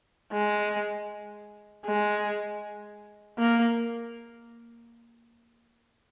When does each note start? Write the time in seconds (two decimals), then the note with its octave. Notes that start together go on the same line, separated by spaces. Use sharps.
0.32 G#3
1.86 G#3
3.39 A#3